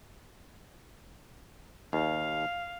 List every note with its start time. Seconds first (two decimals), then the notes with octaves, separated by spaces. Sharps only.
1.93 D#2 F5